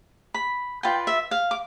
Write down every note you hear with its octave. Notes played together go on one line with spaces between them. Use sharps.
B5
F4 B4 D5 G5
E5
F5
D6